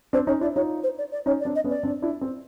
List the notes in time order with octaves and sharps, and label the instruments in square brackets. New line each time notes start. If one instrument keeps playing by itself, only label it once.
[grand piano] C4 D4 [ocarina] C5
[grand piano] C#4 D#4 [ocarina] C#5
[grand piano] D4 E4 [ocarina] D5
[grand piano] D#4 F4 [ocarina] C#5
[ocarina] C5
D5
D5
[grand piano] C#4 D#4 [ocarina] C#5
[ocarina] D5
[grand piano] C4 D4
[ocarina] D#5
[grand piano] B3 C#4
[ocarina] D5
[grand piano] C4 D4
D4 E4
C4